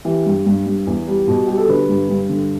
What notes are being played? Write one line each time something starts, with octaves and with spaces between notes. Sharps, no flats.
E3 G4
G2
G2
G2
E2
G3
B2
G3 G4
A4
D3 B4
G2
G2
D3